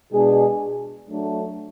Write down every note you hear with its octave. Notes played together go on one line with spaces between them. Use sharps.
B2 G#3 D4 G#4
F#3 A3 D4 A4